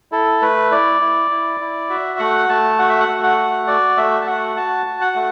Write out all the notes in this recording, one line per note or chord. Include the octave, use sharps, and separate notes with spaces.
E4 A4
A3 B4
E4 D5
E4
E4
E4
F#4 E5
A3 F#5
A3 A5
F#4 F#5
E5
F#5
A3
F#5
F#4
F#4 D5
A3 E5
A5
F#4 F#5
F#4 A5
F#4
F#5
A3